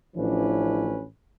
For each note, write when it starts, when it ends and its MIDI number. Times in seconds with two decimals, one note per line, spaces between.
0.16 1.04 33
0.16 1.04 52
0.16 1.04 53
0.16 1.04 61
0.16 1.04 62
0.16 1.04 71